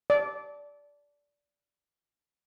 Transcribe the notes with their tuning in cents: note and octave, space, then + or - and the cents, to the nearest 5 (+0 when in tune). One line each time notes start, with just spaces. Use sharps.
D5 -15